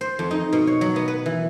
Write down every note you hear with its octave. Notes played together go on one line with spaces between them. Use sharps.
C5
F2
D#4
B2
C#5
F#3
B3
B4
E3